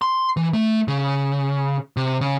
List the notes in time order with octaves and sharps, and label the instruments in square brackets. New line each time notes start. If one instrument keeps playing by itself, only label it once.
[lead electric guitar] C6
E3
A3
C#3
C3
C#3